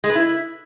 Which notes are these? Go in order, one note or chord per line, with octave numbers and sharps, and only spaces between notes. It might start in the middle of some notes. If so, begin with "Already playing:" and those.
G#3
B4
E4